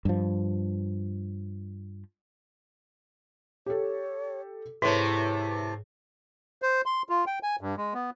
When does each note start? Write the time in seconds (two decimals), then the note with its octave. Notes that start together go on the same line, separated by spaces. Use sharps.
0.05 G2 F3
3.66 G4 A4 C#5
4.82 G#2 C3 A3 E4 B4 C#5
6.62 C5
6.86 C6
7.09 F4
7.27 G5
7.43 G#5
7.61 G2
7.77 G#3
7.94 B3